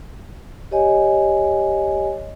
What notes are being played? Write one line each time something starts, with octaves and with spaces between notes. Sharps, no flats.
G4 C#5 D#5 G#5